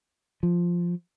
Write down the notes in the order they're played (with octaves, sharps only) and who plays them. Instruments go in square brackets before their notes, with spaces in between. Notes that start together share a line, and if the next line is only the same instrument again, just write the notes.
[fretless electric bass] F3